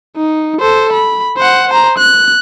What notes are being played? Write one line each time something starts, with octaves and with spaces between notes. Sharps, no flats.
D#4
A4 C5
B5
C5 F#5
C5 A#5
F#6